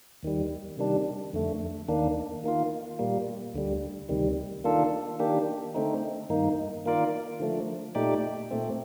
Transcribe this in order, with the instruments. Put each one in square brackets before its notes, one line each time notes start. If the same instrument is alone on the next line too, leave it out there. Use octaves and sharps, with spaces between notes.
[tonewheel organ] D#2 D#3 G3
C3 D#3 G3 D4
F2 D3 A3
D#2 D#3 A#3 D4
D#3 A#3 F4
A#2 G3 A#3
D2 D3 G3
D2 C3 D#3 G3
D#3 A#3 D4 F4 A4
D#3 A#3 D4 G4
D3 A3 C4 D#4
G2 D#3 A#3 D#4
D#3 A#3 F4 A#4 D5
D3 F3 A3
A#2 A3 D#4 G4 D5
A#2 A3 C4